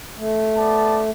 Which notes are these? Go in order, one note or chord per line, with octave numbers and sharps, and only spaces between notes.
A3
B3 D5 A5